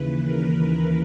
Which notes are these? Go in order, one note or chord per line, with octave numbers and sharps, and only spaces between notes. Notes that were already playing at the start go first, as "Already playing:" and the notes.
Already playing: D#2 C#3 E3 B4
A#4